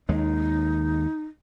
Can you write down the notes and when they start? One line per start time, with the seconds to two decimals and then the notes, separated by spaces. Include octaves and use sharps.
0.09 D#2 G#3 D#4